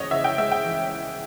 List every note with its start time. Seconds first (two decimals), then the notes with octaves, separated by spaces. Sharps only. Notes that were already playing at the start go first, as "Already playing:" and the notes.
Already playing: C#3 E3 G#3 C#4 C#5 D#5
0.11 C#3 E5
0.24 G5
0.38 G#3 E5
0.51 G5
0.64 E3